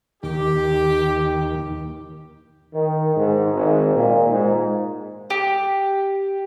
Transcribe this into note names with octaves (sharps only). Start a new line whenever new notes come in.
D#2 G4
D#3
G#2
G#1
A#2
G#2
G4